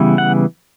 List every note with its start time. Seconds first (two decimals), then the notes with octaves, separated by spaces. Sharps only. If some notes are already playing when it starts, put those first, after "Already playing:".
Already playing: C#3 E3 G3 B3
0.18 F#5